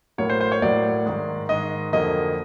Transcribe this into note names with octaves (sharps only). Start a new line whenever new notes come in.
A2 F#3 A#3 C#5
C5
C5
C#5
A2 F#3 A#3 D5
G#2 D#3 G#3
G#2 D#3 G#3 D#5
F2 D3 F#3 A#3 D#5